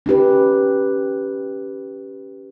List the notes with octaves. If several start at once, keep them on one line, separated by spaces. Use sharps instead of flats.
C#4 D#4 G4 B4